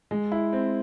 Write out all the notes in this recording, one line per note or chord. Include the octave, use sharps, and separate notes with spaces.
G#3
E4
C4